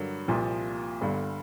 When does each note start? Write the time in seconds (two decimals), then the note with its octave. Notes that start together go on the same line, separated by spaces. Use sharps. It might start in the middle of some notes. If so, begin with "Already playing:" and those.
Already playing: G2 D3 F#3 A#3
0.28 C2 A#2 F3
1.01 G1 G2 D3